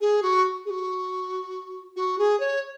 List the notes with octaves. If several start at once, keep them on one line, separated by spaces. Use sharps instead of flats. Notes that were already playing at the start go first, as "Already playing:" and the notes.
G#4
F#4
G#4
F#4
F#4
G#4
C#5